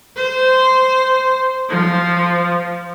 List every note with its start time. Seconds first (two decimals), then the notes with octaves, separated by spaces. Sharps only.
0.16 C5
1.70 F3